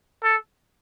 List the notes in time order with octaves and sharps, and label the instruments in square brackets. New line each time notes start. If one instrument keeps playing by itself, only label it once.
[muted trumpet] A4